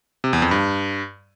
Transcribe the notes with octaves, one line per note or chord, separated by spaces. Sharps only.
C3
E2
F2
G2